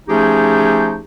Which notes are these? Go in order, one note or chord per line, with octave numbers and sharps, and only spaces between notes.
F3 A3 C#4 D#4 G4 G#4